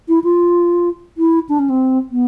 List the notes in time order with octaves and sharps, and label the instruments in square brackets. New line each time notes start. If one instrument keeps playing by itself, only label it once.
[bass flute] E4
F4
E4
D4
C#4
C4
B3